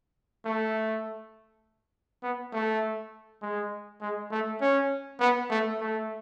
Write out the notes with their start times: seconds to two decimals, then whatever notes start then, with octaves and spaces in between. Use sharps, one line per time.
0.45 A3
2.23 B3
2.53 A3
3.42 G#3
4.01 G#3
4.31 A3
4.61 C#4
5.20 B3
5.50 A3
5.80 A3